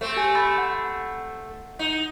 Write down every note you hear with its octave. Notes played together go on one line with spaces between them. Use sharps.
A3 C4
G4 G#5
B5 E6 A6
F#5
D#4